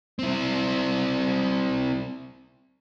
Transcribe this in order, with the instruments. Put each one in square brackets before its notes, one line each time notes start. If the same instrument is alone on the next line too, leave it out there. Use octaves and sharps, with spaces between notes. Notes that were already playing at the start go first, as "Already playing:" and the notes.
[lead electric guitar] C4 E4